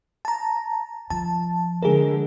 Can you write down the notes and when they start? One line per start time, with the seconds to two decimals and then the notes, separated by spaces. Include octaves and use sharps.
0.25 A5 A#5
1.10 F3 A5
1.83 D3 G#3 G#4 A#4